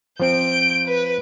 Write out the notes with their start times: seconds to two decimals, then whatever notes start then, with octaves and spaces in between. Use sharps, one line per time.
0.20 F3 C4 G6 D7
0.87 B4